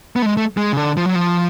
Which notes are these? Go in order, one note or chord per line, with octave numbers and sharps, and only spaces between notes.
B3
A3
G#3
A3
G#3
C#3
D3
F3
F#3
F3